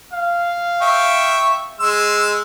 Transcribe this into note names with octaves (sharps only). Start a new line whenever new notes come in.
F5
E5 G5 C#6
G#3 C6 E6